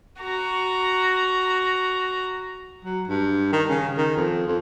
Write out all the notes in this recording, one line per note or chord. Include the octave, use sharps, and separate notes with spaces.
F#4 A#5
F#3
G2
D#3
C#3
D#3
F2
F2